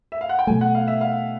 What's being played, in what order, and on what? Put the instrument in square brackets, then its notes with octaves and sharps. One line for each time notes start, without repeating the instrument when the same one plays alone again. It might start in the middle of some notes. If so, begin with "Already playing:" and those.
[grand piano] E5
F5
F#5
G5
[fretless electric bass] B2 F#3 A3 [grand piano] G#5
[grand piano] F#5
F5
E5
F5